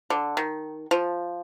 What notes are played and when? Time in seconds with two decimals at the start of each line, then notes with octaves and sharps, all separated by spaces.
0.10 D3
0.37 D#3
0.91 F3